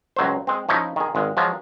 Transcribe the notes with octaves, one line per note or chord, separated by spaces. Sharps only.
C#2 F#3 C5
G#3 C4
F3 C#4 D#4 E4
D#3 G#4
G#1 G#3
F3 F#3 G#3